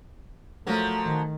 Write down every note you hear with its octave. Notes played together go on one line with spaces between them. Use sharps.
F3 F#3 A3 A#4
D#3